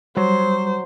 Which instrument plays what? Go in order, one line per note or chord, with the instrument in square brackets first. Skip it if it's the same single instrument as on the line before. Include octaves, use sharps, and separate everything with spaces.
[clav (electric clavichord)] F#3 [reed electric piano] G3 [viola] C5